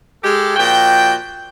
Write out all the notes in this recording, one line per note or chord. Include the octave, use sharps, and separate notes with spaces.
G#3 G4 A4
A#2 F3 F#4 G5